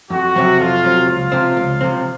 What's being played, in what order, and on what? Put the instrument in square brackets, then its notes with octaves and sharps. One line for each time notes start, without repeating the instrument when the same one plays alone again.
[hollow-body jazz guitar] F2 [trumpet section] F#4
[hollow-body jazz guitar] C3 F#3 C4
[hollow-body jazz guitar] F2 [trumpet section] F4
[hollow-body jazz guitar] C3 F#3 C4
[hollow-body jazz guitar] C#2 [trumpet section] F4
[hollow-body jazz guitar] C3 F3 C4
C#2
C3 F3 C4